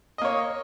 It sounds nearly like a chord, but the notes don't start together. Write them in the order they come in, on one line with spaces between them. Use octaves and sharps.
D#5 A#3 C#5